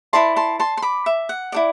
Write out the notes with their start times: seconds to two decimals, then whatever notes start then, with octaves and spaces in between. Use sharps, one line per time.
0.13 E4 B4 D5 A5 C6
0.36 A5 C6
0.60 A5 C6
0.77 C6
0.82 B5 D6
1.06 E5
1.29 F#5
1.52 E4 A4 D5